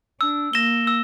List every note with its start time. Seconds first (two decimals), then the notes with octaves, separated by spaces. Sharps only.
0.21 D4 E6
0.53 A#3 A#6 E7 G7
0.87 E6